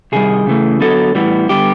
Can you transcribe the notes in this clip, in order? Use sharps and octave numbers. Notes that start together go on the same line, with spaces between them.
C3 D#3 G3 G#4
C#3 E3 A3
D3 F#3 B3 A4
A2 E3 G3 B3
D3 G3 B3 G4